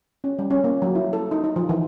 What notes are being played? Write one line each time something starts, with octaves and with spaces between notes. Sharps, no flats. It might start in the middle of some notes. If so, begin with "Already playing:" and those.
C#4
G3
C#4
A#3
F#3
E4
A4
D#4
D#4
F3
E3